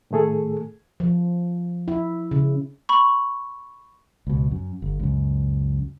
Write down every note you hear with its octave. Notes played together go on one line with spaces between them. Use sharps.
A2 D#3 A3 G#4 A4
F3
E4
C#3
B5 C#6
C#2 B2
F#2
G1
C#2 F#2